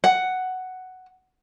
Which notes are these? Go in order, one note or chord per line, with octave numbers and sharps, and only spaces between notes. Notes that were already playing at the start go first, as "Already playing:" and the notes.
F#5